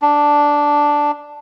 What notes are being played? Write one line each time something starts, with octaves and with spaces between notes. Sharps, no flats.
D4